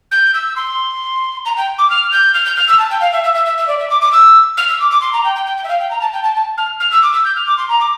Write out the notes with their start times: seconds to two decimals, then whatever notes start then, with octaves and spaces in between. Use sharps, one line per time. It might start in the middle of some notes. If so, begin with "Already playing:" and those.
0.11 G6
0.33 E6
0.56 C6
1.45 A#5
1.56 G5
1.78 D6
1.89 F6
2.11 G6
2.33 F6
2.45 G6
2.56 F6
2.67 E6
2.78 A5
2.90 G5
3.00 F5
3.12 E5
3.23 E5
3.34 E5
3.45 E5
3.57 E5
3.67 D5
3.78 E5
3.89 D6
4.01 D6
4.12 E6
4.57 F6
4.68 E6
4.79 D6
4.90 D6
5.01 C6
5.13 A#5
5.23 G5
5.35 G5
5.46 G5
5.57 G5
5.63 E5
5.68 F5
5.79 G5
5.90 A#5
6.01 A5
6.12 G5
6.23 A5
6.35 A5
6.57 F6
6.79 F6
6.91 E6
7.02 D6
7.13 E6
7.24 G6
7.35 F6
7.46 D6
7.57 C6
7.69 A#5
7.80 D6